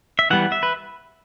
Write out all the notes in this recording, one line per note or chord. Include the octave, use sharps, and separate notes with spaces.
E5
E3 G3 B3 F#5
E5
B4